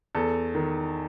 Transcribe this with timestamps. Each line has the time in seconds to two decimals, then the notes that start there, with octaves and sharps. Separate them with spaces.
0.15 E2 A4
0.55 D#3